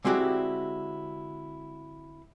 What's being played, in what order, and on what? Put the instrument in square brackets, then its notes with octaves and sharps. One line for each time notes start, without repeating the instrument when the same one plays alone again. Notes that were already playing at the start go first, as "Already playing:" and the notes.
[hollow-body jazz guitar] D3 G#3 C4 E4 F#4 G4